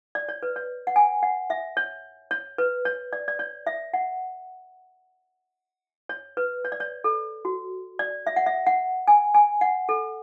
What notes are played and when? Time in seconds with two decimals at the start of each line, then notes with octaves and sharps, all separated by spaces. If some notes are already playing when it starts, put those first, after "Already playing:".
0.15 D5
0.29 C#5
0.43 B4
0.56 C#5
0.87 F#5
0.96 G#5
1.23 F#5
1.50 E5
1.77 C#5
2.31 C#5
2.58 B4
2.85 C#5
3.13 D5
3.28 D5
3.39 C#5
3.67 E5
3.94 F#5
6.09 C#5
6.37 B4
6.65 C#5
6.72 D5
6.80 C#5
7.04 A4
7.45 F#4
7.99 D5
8.27 E5
8.36 F#5
8.46 E5
8.67 F#5
9.08 G#5
9.34 G#5
9.61 F#5
9.89 A4